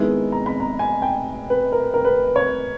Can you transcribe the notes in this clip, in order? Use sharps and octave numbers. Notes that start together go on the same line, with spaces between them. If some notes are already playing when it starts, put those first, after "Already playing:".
Already playing: D#3 G#3 B3 E4
A#5
B5
A#5
G#5
G5
B4
A#4
A#4
B4
C#5